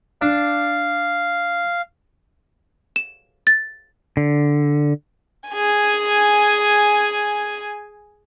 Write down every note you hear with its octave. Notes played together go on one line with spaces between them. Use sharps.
D4 F5
E7
A6
D3
G#4 G#5